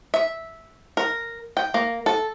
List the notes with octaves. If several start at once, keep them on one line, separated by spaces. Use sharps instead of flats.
E5
A#4
G5
A#3
A4